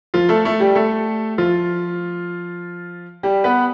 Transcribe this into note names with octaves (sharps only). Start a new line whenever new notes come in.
F3 F4
A3 A4
A3 A4
G3 G4
A3 A4
F3 F4
G3 G4
B3 B4